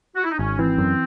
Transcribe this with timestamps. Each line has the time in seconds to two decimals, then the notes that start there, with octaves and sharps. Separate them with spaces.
0.16 F#4
0.24 E4
0.31 D#4
0.39 G#1 C#4
0.59 E3 C4
0.78 F#2